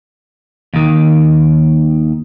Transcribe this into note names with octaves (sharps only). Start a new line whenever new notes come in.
D#2 D#3